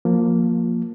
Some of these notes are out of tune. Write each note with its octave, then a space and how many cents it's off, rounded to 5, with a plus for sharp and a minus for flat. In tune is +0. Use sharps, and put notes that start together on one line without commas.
F3 +20 A#3 +0